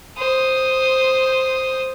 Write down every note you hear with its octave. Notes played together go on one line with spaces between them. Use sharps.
C5 D#6